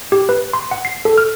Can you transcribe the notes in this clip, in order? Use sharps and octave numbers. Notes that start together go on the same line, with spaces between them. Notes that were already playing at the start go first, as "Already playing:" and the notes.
G4
B4
C6
F#5
C7
A4
F6